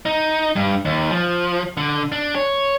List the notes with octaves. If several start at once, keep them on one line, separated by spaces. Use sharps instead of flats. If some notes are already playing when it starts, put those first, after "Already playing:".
D#4
G2
D#2
F3
D3
D4
C#5